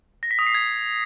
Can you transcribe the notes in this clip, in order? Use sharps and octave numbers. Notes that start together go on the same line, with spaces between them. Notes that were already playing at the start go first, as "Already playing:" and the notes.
A#6
B6
D#6
C7
G#6